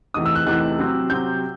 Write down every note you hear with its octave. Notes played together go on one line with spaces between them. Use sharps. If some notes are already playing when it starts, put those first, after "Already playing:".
E2 C3 E3 A3 D#4 D#6
E6
F#6
E2 C3 E3 A3 D#4 F#6
C3 F#3 C4
C3 F#3 C4 G6